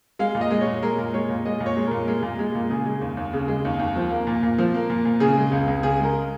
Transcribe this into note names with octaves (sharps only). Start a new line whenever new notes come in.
G#3 F5
A#2
D#5
G#3
C#5
A#2
G#3 A#4
A#2
G#3 C#5
A#2
G#3 D#5
A#2
C#5
G#3
A#2 A#4
G#3 A#4
A#2
G#3
A#2
C#3 G#4
G#3
D#2
D#2
C#3
G#3
D#2
D#2
F3
A#3
A#2
A#2
F3
A#3
A#2
A#2
C#3 G#4
G#3
C#2
C#2
C#3 G#4
G#3 A#4